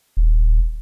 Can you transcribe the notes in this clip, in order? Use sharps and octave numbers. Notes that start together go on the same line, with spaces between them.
D#1